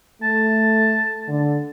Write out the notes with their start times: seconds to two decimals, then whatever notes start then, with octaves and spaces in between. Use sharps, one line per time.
0.22 A3 A5
1.28 D3